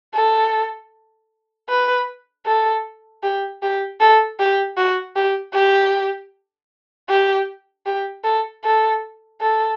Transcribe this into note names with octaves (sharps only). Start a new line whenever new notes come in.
A4
B4
A4
G4
G4
A4
G4
F#4
G4
G4
G4
G4
A4
A4
A4